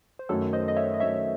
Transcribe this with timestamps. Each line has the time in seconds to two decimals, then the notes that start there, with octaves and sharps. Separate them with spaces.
0.19 C5
0.29 F#2 D#3 A3 A4 C#5
0.53 C5 D#5
0.68 D#5
0.76 C#5 E5
0.94 D#5
1.00 F#2 D#3 A3 C#5 E5